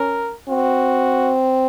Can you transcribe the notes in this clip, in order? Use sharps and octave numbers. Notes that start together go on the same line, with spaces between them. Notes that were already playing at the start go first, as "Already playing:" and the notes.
Already playing: C#4 A#4
C4 F#4